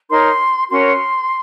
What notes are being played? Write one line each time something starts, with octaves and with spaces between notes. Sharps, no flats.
D#4 A#4 C#5 C6
C#4 F#4 A#4 C#5 C6